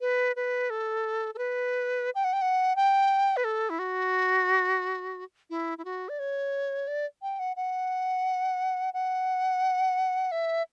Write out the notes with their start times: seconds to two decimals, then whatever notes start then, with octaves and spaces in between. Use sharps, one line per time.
0.01 B4
0.36 B4
0.70 A4
1.34 A4
1.38 B4
2.15 G5
2.24 F#5
2.33 G5
2.42 F#5
2.76 G5
3.37 B4
3.44 A4
3.70 E4
3.79 F#4
5.50 E4
5.78 E4
5.85 F#4
6.09 D5
6.19 C#5
6.87 D5
7.22 G5
7.39 F#5
7.56 F#5
8.94 F#5
10.32 E5